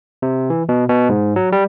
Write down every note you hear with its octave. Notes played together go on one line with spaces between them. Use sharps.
C3
E3
B2
B2
G#2
F#3
G3